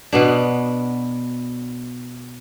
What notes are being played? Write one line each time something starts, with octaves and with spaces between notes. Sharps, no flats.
B2 B3 D4